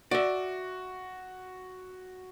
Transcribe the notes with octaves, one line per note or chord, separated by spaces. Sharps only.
F#4 D5 E5